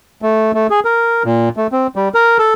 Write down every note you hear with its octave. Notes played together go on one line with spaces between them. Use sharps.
A3
A3
G#4
A#4
A#2
A3
C4
G3
A#4
A4